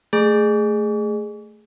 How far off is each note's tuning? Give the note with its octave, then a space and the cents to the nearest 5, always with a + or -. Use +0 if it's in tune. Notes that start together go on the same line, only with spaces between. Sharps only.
A3 +0 G#4 +0